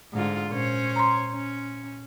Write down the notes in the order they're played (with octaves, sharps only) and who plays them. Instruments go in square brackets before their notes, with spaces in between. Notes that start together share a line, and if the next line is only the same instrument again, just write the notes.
[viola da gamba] G#2 D3 F4
[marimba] A#2 [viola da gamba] C#4 C5 C#5
[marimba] A#5 C6
[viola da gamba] C#4